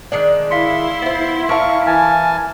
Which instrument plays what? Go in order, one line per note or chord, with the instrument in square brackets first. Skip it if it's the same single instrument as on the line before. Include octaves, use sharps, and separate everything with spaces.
[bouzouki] D#3 G#3 D4 [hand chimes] D5
[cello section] E4 [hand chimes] F5 B6 C#7 [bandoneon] C6
[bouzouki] B3 C5
[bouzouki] A#4 F5 [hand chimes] E5 A5 [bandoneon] C#6
[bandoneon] E3 G#5 A5 [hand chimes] F6